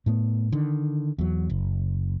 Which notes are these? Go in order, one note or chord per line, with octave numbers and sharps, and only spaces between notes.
A2 A3 B3
D3 D#3
E2 F#3
F#1